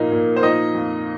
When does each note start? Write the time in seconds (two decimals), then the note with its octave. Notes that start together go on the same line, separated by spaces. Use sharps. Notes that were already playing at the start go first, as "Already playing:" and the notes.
Already playing: A#2 F3 A#3 D#4
0.12 A#2
0.36 C5
0.43 F3 D#4 D#5
0.74 F2